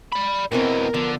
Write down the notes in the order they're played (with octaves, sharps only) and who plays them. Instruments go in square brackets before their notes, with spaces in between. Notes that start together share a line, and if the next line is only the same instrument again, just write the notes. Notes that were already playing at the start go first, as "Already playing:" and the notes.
[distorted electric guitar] D5 B5
[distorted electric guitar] B2 E3 [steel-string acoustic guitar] B3 C4 C5 [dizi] A#4
[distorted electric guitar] D3 [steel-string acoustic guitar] F3 B3